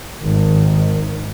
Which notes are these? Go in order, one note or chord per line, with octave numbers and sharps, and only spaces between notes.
G#1 D#3